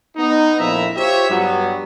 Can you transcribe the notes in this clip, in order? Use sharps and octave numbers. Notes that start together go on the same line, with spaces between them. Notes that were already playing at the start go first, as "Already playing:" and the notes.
B3 D#4
A#1 F2 E4 E5 A#5
F4 G4 C5 C#5 E5
G2 F#3 G3 B3